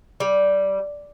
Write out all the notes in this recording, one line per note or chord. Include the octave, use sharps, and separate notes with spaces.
G3